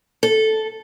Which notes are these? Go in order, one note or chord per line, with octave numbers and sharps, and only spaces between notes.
A4